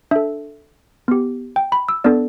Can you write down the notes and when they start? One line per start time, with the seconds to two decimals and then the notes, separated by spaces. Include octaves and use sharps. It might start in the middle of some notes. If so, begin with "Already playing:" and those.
0.11 D4 A4 E5
1.08 B3 G4
1.56 G5
1.72 B5
1.89 E6
2.04 B3 D4 A4 D5